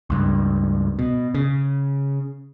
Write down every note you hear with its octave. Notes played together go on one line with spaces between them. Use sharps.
C#2 G2
B2
C#3